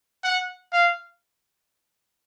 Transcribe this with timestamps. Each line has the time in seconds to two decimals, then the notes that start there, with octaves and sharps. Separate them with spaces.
0.24 F#5
0.72 F5